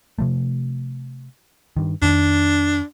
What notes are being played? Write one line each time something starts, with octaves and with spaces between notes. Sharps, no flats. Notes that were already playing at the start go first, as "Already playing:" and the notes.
C3 F3 A3
G2 D#3
F2 D#3 D4